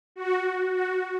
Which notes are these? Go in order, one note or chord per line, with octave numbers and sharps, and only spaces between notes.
F#4
F#4